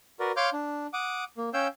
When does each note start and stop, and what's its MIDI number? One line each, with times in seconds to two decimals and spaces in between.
0.20 0.32 66
0.20 0.32 70
0.20 0.32 71
0.20 0.32 74
0.37 0.50 73
0.37 0.50 77
0.37 0.50 84
0.37 0.50 86
0.37 0.50 89
0.37 0.50 91
0.53 0.87 62
0.93 1.24 78
0.93 1.24 86
0.93 1.24 87
1.37 1.50 58
1.54 1.68 61
1.54 1.68 73
1.54 1.68 77
1.54 1.68 79
1.54 1.68 88
1.54 1.68 91